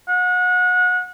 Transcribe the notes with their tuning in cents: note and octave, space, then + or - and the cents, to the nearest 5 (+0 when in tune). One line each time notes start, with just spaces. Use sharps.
F#5 -30